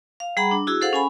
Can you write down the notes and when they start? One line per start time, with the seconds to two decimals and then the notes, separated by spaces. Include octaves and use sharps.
0.20 F5
0.37 G3 G#4 F#5 A#5 B5
0.51 D4
0.67 E4 F#4 G#4 E6
0.81 G#4 A4 C5 F5 F#5
0.93 C#4 G#5 B5